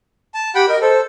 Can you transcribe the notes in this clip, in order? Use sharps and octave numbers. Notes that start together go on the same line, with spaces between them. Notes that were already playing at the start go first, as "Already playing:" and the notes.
A5
G4 F#5 G5 B5
A#4 D#5
A4 C5